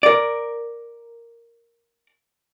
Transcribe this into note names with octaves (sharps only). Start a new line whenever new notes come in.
A#4 D5